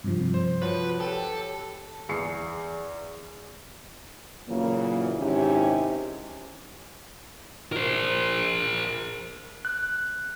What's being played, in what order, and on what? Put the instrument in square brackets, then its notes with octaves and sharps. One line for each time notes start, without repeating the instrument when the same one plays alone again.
[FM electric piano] G2 C3 F3
[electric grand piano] C5
[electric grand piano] F3 F#4 [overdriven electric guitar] B4 [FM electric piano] C#5
[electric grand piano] G4 G5 [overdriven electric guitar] A4
[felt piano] E2 C7 C#7
[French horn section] A#2 C#3 E3 F#3 A#3
G#2 C3 D#3 C#4 E4 G4
[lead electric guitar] A#4 C5
[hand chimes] F#6